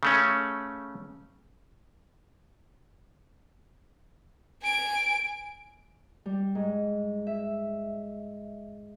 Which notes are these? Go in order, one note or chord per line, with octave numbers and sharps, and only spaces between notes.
C#3 A3 C#4
G#5 D7
G3
G#2
E5